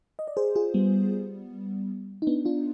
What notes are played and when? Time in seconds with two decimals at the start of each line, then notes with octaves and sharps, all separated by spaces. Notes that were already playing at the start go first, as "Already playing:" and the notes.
0.19 D#5
0.28 D5
0.37 G#4 C5
0.56 F4 G#4
0.74 G3 B3
2.22 D#4
2.27 B3 D4
2.45 D4 F4